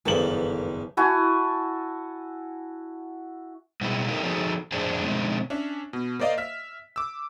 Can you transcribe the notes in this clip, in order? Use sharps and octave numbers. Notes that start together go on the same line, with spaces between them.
F#1 E2 G2 D#3 A#3 A4 C5 F#7
E4 F#4 G#5 A5
B2 G3 B3 E4 G#4
A#3 C4 D#4 G4 A4 A#4
F3 D#4 F#4 G#4 A4
F2 A2 D4 G#4 C5
B2 D3 F3 G#3 C4 D#4
C#4 D4 E5
B2
A#3 C5 D5 D#5 F5
E5 F6 B6
D6 E6